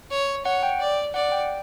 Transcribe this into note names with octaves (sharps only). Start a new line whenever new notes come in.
C#5
C#5 F#5
G5
D5
D5 F#5
G5